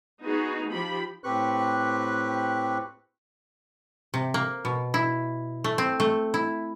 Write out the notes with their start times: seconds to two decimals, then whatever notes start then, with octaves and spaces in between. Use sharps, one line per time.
0.25 B3 D#4 F#4 G#4
0.70 F3 G4 B5
1.24 A2 C4 G4 B4 C#6 F#6
4.14 C3
4.34 A#3
4.65 B2
4.94 E4
5.64 A3
5.78 C4
6.00 A3
6.34 E4